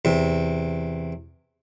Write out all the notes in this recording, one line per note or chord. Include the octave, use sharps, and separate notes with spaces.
E2 C3